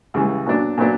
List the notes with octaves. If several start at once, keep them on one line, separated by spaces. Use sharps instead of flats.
C#2 C#3 E3 G3
A#2 F#3 B3 D4
A#2 F#3 B3 D4